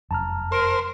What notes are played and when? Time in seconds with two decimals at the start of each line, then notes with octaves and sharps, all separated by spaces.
0.11 F1 F#2 A5 A#5 F6
0.52 A#4 C5